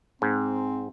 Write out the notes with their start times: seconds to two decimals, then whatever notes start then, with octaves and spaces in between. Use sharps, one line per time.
0.22 G#2 C4